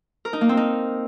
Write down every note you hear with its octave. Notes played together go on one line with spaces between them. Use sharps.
A#4
D#4
A#3
C4
D#4